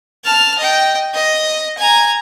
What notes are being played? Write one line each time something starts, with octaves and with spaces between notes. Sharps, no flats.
A5 F6
D#5 G5
D#5
G#5 A#5